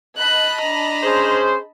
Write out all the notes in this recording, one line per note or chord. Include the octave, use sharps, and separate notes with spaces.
D#5 A5 B5 F#6
D4 A#5
C#4 G#4 C5